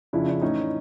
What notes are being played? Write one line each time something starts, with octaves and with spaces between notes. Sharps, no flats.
F2 C#3 F3 D4 E4
D4
A2 E3 C#4 D#4